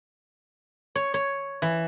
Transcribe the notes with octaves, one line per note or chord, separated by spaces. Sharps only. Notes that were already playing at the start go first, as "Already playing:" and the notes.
C#5
C#5
E3